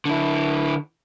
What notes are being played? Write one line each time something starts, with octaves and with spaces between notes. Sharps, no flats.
D3 E4